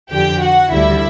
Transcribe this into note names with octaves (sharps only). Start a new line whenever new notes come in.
F2 D3 F3 G4 G5
F#4 F#5
D2 D3 G3 E4 E5